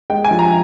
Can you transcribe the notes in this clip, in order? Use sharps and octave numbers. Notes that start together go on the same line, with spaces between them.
G#3 G5
G#5
F3
A#5